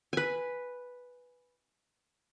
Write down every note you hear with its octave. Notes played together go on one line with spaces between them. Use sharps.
B4 G#5